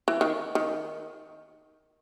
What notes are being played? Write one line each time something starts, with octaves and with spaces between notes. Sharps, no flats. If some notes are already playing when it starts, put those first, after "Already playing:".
E3
D#3
D#3